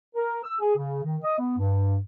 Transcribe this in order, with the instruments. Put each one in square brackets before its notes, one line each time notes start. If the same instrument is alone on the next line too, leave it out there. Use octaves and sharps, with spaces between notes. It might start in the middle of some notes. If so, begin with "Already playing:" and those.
[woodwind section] A#4
E6
G#4
C#3
D#3
D#5
B3
G2